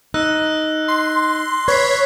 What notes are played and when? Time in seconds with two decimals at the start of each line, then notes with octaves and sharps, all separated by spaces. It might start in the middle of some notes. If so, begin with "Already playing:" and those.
0.14 D#4 E6 F#6 A#6
0.88 C6
1.68 B4 C#5 G#6 B6 C7